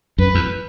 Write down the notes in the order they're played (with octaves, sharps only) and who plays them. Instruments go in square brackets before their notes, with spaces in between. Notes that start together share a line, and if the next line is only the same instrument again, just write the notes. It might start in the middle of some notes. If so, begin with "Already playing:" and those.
[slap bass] F#2 [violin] B4
[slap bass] E2